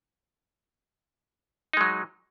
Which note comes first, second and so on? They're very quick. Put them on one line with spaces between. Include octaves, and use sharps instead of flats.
D#4 G#3 F#3